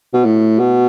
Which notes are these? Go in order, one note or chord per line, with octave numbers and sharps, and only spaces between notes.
B2
A2
B2